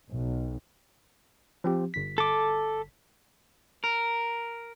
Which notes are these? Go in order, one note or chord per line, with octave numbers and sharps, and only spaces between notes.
B1
F3 C4 G4
G1 B6
A4 D6
A#4